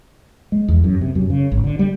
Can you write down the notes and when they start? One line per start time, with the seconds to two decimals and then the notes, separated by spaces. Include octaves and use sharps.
0.52 G#3
0.68 E2
0.84 F#2
1.01 C3
1.15 F#2
1.30 C#3
1.52 G#1
1.64 D3
1.79 G3